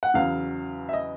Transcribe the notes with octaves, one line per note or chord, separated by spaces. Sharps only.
F#5
E2 C#3 F#3 F5
E5
D#5